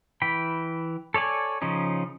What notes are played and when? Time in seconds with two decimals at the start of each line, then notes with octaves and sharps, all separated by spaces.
0.22 E3 G5 B5
1.14 A4 C#5 D5 G#5
1.62 C#3 F3 C#4 D#4